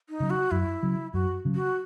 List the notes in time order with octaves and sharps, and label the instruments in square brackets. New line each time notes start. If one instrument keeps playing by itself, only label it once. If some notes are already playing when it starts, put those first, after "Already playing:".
[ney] D#4
[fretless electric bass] C#3 F#3
[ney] F#4
[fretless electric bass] F#2 [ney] E4
[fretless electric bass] C#3 F#3
[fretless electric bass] F#2 [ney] F#4
[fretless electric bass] C#3 F#3
[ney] F#4